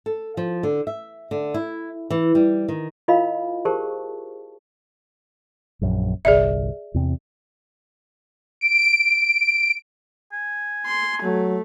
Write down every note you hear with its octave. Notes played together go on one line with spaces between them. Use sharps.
A4
F3
D3
E5
D3
E4
E3
G3
D#3
E4 F4 A#4 D#5 F5 B5
G4 G#4 A#4 C5 A5 C#6
A#1 F#2
G1 C2 G#4 D5 E5
E2 C3 C4
D7
G#5
C6
F#3 A3